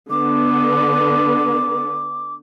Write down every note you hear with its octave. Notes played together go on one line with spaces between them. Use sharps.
D3 B3 D6